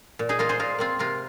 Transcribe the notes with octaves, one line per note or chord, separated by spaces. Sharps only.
A#2
D#4 G#4
A#3 F4 A#4
G#4 C5
A#2 F4 A#4
A#3 C4 F4
C3 F4 A#4